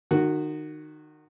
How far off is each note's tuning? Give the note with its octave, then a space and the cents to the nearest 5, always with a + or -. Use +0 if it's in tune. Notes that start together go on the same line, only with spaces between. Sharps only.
D#3 -25 F#4 +0